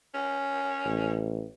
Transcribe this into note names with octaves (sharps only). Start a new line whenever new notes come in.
C#4
A1